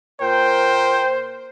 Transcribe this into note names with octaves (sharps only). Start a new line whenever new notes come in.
A#2 A#4 C5 G5